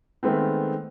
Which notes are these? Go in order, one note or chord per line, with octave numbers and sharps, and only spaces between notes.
D#3 G#3 A3 B3 C4